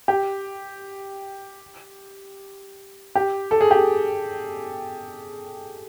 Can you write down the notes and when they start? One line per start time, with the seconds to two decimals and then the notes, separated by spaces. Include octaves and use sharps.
0.08 G4
3.15 G4
3.51 A4
3.61 G#4
3.71 G4